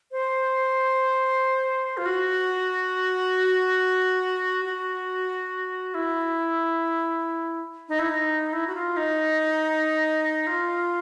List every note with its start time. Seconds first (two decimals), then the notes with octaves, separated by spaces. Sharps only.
0.12 C5
1.97 F4
2.06 F#4
4.65 F#4
5.94 E4
7.89 D#4
7.99 E4
8.09 D#4
8.53 E4
8.67 F#4
8.75 F4
8.97 D#4
10.47 F4